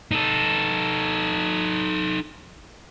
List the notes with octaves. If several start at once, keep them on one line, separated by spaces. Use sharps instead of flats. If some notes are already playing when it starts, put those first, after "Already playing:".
D#4 A4